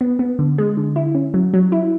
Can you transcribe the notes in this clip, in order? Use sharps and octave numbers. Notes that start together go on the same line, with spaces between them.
B3
B3
D3
G#3
D3
E4
C#4
F#3
F#3
E4